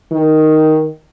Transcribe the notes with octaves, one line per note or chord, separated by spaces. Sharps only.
D#3